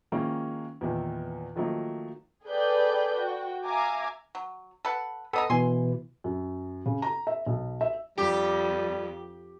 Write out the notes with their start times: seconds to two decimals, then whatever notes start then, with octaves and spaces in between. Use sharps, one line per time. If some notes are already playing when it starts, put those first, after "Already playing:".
0.12 D#3 F3 G#3 A#3 C#4 E4
0.81 E2 A#2 D#3 E3
1.56 D#3 F3 F#3 A3 A#3 D#4
2.45 G#4 A4 B4 D5 G5 G6
3.15 F#4 G5
3.65 E5 F5 G#5 A#5 D6
4.35 F#3
4.85 A4 B4 F#5
5.33 B3 A4 D#5 A#5
5.50 B2 E3 G#5 C6
6.24 F#2
6.86 C#3
7.02 A#5
7.27 E5
7.46 B1
7.81 E5
8.18 F2 G3 G4